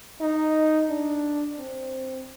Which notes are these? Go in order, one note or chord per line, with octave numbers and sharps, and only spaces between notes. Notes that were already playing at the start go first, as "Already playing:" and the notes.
D#4
D4
C4